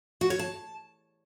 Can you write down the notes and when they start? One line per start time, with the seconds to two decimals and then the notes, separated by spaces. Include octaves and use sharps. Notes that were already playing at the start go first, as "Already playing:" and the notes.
0.21 F#4
0.30 C#5
0.39 A5